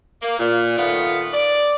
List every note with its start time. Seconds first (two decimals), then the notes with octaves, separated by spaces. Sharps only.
0.22 A#3
0.39 A#2
0.77 D#3 A3 B3 F4
1.33 D5